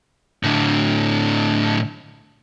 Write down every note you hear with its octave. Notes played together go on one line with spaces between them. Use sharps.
A2 D3